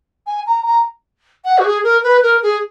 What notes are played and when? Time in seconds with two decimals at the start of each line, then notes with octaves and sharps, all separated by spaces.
0.27 G#5
0.46 A#5
0.66 A#5
1.45 F#5
1.58 F#4
1.64 G#4
1.84 A#4
2.03 B4
2.23 A#4
2.43 G#4